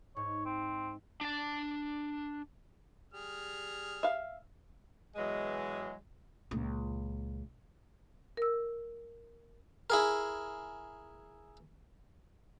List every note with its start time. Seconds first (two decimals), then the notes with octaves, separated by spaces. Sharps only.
0.16 G#2 C#5
0.46 C4
1.21 D4 A5
3.13 G3 G#4 F6
4.03 E5 F5
5.16 B2 E3 F#3 G#3
6.51 C#2 A#2
8.37 A#4 E6
9.90 E4 G#4 A#4